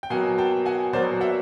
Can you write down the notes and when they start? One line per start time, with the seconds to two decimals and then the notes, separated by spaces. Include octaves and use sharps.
0.03 G5
0.10 B2 F#3 A#3 F#5 G#5
0.38 G5 A5
0.66 F#5 G#5
0.93 B2 F#3 A#3 C5 D5
1.21 E5 F#5